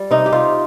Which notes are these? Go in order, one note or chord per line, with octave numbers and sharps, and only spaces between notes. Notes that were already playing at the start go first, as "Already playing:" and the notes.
Already playing: G3
C3 D#4
G4
C3 F4